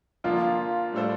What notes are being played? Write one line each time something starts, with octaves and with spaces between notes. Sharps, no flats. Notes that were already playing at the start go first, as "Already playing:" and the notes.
D3 F3 A#3 F4
A2 G3 D4 A4 C5